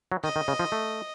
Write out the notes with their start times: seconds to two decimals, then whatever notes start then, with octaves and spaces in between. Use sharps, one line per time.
0.12 F#3
0.24 D#3 D#5
0.36 D#3
0.48 C#3
0.59 F3
0.72 A3